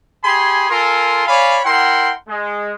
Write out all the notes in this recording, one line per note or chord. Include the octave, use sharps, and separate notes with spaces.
G4 G#4 G#5 B5 C6
F4 A4 A#4 G#5 C6
C#5 D5 F5 G#5 B5
E4 A#4 F#5 G5 C6
G#3